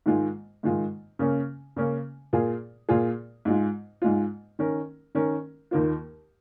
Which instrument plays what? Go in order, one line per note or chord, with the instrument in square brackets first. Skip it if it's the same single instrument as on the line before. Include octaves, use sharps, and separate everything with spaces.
[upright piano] G#2 D#3 G#3 F4
G#2 D#3 G#3 F4
C#3 A#3 C#4
C#3 A#3 C#4
A#2 A#3 F4 G#4
A#2 A#3 F4 G#4
G#2 G#3 F4
G#2 G#3 F4
D#3 C#4 A#4
D#3 C#4 A#4
D#2 D#3 A#3 F4